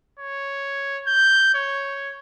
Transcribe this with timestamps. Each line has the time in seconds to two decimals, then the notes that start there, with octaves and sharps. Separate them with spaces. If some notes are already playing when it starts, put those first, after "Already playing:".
0.19 C#5
1.07 G6
1.54 C#5